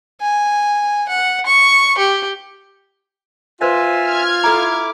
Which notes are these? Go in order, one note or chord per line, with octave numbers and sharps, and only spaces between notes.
G#5
F#5
C#6
G4
F4 B4 C5 D#5 E5 G#5
F6 G#6
E4 A4 A#5 D6